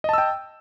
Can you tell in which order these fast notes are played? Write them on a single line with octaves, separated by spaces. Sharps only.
D#5 A5 E6 G5